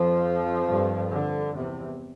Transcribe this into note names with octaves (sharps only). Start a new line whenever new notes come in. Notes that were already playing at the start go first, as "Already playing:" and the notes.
Already playing: F2 F3
G2
D3
E2 C3